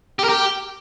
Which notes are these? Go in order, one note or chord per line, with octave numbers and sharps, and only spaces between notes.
G4
A#4
G4